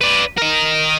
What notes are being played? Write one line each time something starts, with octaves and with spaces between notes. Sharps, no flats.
B4 D5
A#4 D#5